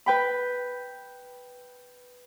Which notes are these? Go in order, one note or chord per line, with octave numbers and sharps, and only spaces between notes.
B4 G5 B5